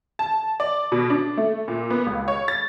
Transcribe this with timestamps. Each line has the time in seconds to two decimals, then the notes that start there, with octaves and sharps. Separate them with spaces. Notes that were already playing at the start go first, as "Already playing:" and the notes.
0.19 A5
0.60 D5
0.92 B2
1.10 D4
1.37 A3
1.68 A#2
1.90 B3
2.07 C#2
2.28 C#5
2.48 A6